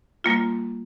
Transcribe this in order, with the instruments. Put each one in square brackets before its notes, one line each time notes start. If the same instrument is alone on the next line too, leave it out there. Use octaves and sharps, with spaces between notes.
[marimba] G3 A#3 F4